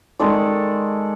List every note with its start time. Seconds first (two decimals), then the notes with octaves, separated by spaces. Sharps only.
0.19 D#3 G#3 A4 D5